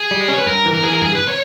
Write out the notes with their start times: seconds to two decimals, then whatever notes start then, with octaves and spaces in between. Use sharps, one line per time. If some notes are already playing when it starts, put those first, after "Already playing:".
Already playing: G#4
0.11 G3
0.20 D#5
0.28 C#4 C#5
0.38 B4
0.46 G2 A#4
0.66 E3
0.74 A#4
0.83 E3 G#4
0.92 A#4
1.01 G2 G#4
1.15 B4
1.28 C#5